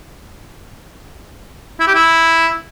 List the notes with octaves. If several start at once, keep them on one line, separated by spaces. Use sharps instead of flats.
E4
G4
E4